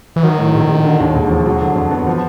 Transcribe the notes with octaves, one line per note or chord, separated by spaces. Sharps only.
E3
D#3 F#3
A2
A#1
A#1
D3
D#2
E1
F3
F#3
D3
F2
B3
F3